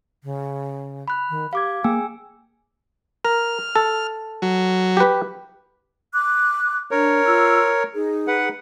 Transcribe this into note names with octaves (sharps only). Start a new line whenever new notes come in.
C#3
B5 F#6
D#3
G4 F5 D6 G#6
A#3 G#4 G5 G#5 E6
A#4 F6
A4
F#3
G4 B4
D6 F#6
D4 A#4 C#5
F4 E6
D#4 G#4
B4 F#5